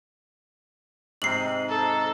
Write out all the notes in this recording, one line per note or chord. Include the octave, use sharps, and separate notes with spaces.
G#2 C3 D#4 C7 F#7
A4 A#5